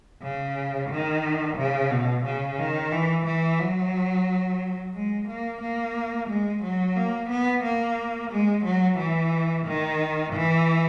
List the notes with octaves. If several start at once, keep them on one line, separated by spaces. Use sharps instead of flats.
C#3
D#3
C#3
B2
C#3
D#3
E3
E3
F#3
G#3
A#3
A#3
G#3
F#3
A#3
B3
A#3
G#3
F#3
E3
D#3
E3